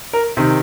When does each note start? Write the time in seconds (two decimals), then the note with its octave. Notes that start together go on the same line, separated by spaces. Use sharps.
0.13 A#4
0.37 C3 D#3